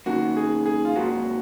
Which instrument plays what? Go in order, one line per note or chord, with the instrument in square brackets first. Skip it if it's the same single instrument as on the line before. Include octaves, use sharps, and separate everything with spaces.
[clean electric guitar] F#2 D#3 A#3 [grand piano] F#4
[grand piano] G#4
G#4
F4
[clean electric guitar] G#2 F#3 A#3 [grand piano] F#4